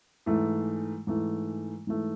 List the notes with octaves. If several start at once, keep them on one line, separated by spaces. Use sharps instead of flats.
G#2 E3 A3
G#2 E3 A3
G#2 E3 A3